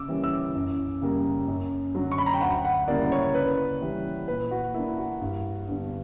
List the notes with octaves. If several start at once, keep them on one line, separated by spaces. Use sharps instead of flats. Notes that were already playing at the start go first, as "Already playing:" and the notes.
Already playing: C#3 D6 E6
E3 G3 A#3 C#4
E6
F#2
C#3 G3 A#3
F#2
D3 F#3
C#6
B5
A#5
G5
D2 F#5
F#5
C#3 G3 A#3 E4 D5
C#5
C#3 B4
E3 G3 C#4
A#2 B4
F#4
A#3 D4 E4
F#4
G2
D3 G3 B3 D4